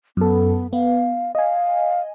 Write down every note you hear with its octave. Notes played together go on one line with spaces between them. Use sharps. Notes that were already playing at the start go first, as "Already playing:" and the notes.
F#2 B3 A4
B3 F5
D#5 F5 G#5